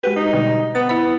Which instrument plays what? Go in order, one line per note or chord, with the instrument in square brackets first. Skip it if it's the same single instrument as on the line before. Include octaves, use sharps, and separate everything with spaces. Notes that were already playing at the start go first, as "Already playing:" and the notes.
[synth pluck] G#3 F#4 G4 [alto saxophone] B4
[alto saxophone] D#4
[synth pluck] B2 D3 G3
[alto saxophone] B3 [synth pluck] A6
[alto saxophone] B3 [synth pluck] E4 B5